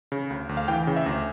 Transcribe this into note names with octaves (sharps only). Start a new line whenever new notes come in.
C#3
D2
D2
F5
E3 G5
C#3
E5
D2